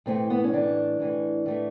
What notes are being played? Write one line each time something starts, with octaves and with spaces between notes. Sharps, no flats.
A2 E3 A3 C4
B3
C#4
A2 E3 A3 D4
A2 E3 A3
A2 E3 A3